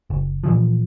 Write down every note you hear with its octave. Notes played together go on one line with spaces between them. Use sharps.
F#1
A#2 E3 F3